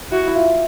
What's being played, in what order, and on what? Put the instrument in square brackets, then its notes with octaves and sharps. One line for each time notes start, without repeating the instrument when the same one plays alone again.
[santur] E4 [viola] F#4
[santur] E4
F4